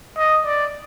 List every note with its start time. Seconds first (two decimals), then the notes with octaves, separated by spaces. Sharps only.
0.18 D#5
0.46 D5